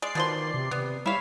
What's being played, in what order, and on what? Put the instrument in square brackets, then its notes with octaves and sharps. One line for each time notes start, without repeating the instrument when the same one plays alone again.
[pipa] G#3 [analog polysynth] D5 C7
[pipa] B2 F3 C6 [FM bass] D#3
[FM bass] C3
[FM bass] C3 [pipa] B3
[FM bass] G3 [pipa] E4 C#5 [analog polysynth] E5 F5